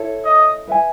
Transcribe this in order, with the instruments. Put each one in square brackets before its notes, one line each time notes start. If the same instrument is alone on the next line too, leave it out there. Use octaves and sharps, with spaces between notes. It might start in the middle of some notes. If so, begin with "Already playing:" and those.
Already playing: [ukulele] E4 A4 C#5
[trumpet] D#5
[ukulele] B4 E5 G#5